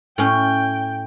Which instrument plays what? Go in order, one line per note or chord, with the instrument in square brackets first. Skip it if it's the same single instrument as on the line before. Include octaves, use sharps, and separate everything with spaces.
[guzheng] A2 C#4 [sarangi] G5